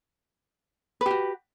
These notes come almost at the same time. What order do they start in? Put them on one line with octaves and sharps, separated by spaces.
B4 G4 F#4